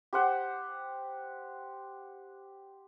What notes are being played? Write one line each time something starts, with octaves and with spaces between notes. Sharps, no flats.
G4 C5 F#5